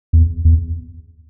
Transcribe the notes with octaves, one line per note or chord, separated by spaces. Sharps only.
E2
E2